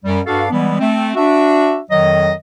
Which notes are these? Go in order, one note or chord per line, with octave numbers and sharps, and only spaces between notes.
F#2 G3
G2 D4 F#4 A4 F5
E3 G3 G#3 B3
A3 C4
D4 F#4 E5
F2 D#3 F#3 D#5